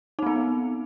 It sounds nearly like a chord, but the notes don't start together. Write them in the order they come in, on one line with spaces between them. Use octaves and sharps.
D#4 C4 B3